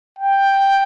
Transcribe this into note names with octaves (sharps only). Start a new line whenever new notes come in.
G5